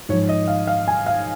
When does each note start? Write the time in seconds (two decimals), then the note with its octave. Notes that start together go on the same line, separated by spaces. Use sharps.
0.09 G#2 C#5
0.13 F3
0.29 D#5
0.48 F5
0.67 F5
0.88 G#5
1.06 F5